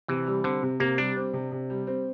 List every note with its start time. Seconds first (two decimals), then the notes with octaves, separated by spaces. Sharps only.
0.08 C3 E3
0.27 G3
0.44 D3 C4
0.63 C3
0.80 C3 A#3
0.98 G3 D4
1.17 C4
1.33 C3
1.52 C3
1.70 G3
1.87 C4